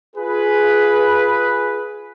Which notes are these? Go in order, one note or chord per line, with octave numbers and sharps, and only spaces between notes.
F4 G#4 B4